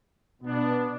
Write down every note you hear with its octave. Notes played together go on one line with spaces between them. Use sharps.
B2 B3 D4